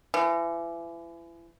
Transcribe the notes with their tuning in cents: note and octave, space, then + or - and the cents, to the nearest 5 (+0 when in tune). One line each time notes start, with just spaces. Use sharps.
E3 +35